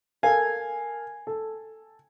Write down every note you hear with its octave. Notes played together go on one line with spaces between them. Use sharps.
A4 A#4 F5 G#5
A4